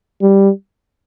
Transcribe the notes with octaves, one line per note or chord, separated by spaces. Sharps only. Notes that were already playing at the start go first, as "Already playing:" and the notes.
G3